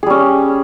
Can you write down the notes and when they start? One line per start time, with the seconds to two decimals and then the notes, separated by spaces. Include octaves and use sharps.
0.03 G#4
0.06 G3
0.10 C#4